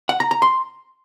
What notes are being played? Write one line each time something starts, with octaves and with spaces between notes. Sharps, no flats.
F#5
A#5
A#5
C6